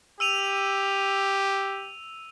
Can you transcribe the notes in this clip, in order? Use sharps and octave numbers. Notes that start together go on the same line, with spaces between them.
G4 E6 D#7 F7